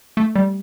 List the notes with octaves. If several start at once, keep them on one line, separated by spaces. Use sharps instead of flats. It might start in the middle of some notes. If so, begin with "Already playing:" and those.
A3
G3